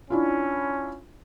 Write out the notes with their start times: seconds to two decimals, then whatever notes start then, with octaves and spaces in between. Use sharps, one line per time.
0.10 C#4 D4 E4 F4